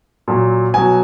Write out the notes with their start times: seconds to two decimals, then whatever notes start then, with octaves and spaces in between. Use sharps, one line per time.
0.28 A#2 F#3
0.74 B2 F#3 G#5